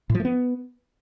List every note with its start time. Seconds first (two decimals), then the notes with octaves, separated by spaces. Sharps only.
0.10 A2
0.15 F3
0.20 A3
0.25 B3